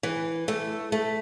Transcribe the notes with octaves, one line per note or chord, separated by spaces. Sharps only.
E3
A3
A3